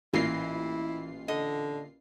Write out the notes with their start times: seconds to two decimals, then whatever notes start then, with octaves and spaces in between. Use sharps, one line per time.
0.14 A1 A#2 E3 E4 F4 A#6 C7
1.28 D3 D#5